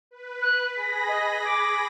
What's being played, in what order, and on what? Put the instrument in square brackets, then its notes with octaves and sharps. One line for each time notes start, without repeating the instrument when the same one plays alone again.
[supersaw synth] B4
[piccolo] F#6
[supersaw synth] G#4 B5 A#6 [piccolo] B6
[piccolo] D#5
D6